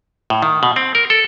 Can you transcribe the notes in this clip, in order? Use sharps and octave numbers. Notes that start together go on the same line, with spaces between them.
A2
D#3
B2
C4
A#4
A4